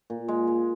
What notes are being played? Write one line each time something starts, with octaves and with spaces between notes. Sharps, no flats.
A#2
G#3
G#3